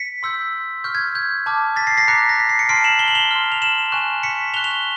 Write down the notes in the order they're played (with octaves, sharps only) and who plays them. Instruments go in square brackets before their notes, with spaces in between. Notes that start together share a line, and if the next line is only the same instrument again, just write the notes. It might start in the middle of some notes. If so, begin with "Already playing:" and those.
Already playing: [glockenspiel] B6 C#7
C6 E6 G6
C#6 F6 G6
G#6
G6
A5 D6 F6
A6 B6
A#6 C7
A#6 C7
A#5 D6 F#6 B6 C#7
A#6
B6
C7
C#7
A5 C6 F6 C7 D7
E7 F#7
G7
F#7
F7 G7
C6 F6
F7
E7 F#7
G#5 C#6 F#6
B6 C#7
C#6 F#6 F7 G7
F7 G7